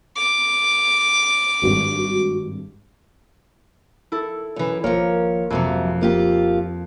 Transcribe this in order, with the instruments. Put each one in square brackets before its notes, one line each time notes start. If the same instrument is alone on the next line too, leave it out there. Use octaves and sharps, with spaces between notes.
[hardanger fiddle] D6
[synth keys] G#1 G2 [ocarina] F#4
[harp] E4 A4
[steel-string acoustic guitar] F#2 E3
[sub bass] G#1 [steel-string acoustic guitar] F3 C#5 [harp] A#3
[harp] F2 [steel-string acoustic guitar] G#2 C3 F#3
[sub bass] D1 [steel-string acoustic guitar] A#3 F4 G4